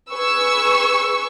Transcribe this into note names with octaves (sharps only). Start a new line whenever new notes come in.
G#4 B4 C#6 E6